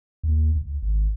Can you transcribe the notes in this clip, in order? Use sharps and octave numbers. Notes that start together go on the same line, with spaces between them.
D#2
C#2
G#1